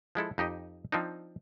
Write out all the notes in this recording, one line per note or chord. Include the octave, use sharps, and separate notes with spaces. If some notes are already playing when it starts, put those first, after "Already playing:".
F3 G#3 E4 A4
F2 D#4 G4 D#5
F3 C4 D4 D#4